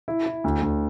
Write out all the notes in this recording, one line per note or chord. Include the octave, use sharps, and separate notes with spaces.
E4
E4
D2
D2